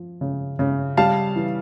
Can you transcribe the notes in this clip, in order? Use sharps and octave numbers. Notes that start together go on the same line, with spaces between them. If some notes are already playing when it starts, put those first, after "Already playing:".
Already playing: F3
C#3
C#3
G3 F5 A5
E3